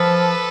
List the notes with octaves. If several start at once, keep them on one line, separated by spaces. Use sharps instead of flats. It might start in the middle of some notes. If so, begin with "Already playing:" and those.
Already playing: F3 A4 B4